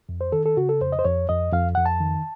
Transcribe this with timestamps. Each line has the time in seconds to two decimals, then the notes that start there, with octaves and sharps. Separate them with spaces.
0.09 F2
0.21 C5
0.32 D#3 A4
0.46 A4
0.57 C#3 F#4
0.69 A4
0.81 F2 C5
0.92 D#5
0.99 C5
1.05 F2 C#5
1.29 F2 D#5
1.53 F2 F5
1.75 F2 F#5
1.86 A5
2.00 D#3